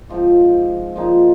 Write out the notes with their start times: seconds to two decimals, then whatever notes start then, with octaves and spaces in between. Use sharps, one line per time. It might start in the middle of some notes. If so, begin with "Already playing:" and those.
0.09 G#2 F3 C4
0.95 A#2 F3 G#3 D#4